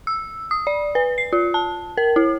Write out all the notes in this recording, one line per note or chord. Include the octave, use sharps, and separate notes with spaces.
E6
D#6
D5
B4
C7
F4
A5
A#4
E4